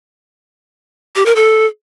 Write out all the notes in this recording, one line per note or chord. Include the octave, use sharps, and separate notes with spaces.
G4
A#4
A4